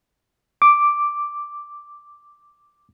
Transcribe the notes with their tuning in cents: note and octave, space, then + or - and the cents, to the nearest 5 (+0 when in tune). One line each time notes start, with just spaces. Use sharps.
D6 +0